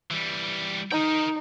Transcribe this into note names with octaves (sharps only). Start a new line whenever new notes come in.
E3 G3
D#4 A#4 G5